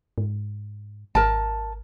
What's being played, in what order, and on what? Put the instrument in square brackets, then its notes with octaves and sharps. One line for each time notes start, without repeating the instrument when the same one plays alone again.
[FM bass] G#2
[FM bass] G#1 [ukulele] A#4 A5